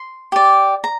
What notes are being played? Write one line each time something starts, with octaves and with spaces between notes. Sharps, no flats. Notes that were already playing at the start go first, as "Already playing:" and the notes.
Already playing: C6
G4 D5
A#5